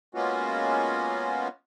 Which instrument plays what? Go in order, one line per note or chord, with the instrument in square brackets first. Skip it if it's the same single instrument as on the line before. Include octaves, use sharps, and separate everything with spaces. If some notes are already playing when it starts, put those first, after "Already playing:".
[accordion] G#3 A#3 B3 C#4 F4 F#4